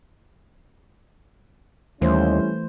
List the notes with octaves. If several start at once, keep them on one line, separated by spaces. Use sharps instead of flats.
D#2 E3 G3 A3 C#4 E4 C5